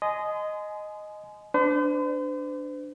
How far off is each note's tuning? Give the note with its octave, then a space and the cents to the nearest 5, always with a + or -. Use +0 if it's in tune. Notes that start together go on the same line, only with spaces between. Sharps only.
D#5 -5 G#5 +25 C6 -30
D4 +0 C5 -45